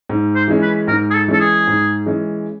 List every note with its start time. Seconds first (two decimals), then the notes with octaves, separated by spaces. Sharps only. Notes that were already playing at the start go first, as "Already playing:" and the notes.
0.09 G#2
0.35 C5
0.48 E3 G#3 C#4
0.62 B4
0.88 G#2 A#4
1.11 G#4
1.14 A4
1.28 E3 G#3 C#4 A4
1.40 G#4
1.67 G#2
2.06 E3 G#3 C#4